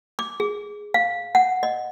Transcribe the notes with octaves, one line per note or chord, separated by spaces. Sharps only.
D6
G#4
F5
F#5
D#5